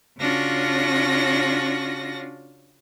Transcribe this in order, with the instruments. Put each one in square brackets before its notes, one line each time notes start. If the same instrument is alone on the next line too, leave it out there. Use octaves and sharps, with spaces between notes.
[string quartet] C#3 C#4 D4 F4 F#4 A#6